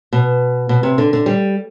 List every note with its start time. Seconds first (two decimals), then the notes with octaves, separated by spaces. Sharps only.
0.13 B2
0.69 B2
0.83 C3
0.98 D3
1.13 D3
1.26 G3